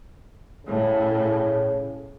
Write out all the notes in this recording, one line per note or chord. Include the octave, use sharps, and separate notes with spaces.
A2 C#3